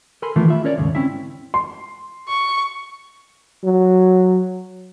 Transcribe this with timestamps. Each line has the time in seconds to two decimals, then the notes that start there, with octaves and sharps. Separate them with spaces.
0.22 A4 A#4 G#5 B5 C6
0.36 D#3 E3 A3 B3 E4 F4
0.48 F4 E5 B5
0.64 C#4 A#4 C#5 D5
0.78 D#2 G#2 C#3
0.95 C4 C#4 E4 E5
1.54 C6
2.28 C#6
3.64 F#3